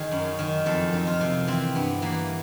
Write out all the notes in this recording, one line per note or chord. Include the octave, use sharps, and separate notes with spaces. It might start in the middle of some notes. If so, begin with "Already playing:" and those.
Already playing: D#3 G#4
F#2
D#3
F2 A4
D#3
F4
C3
E3 C4
G2 B3
E3 A#3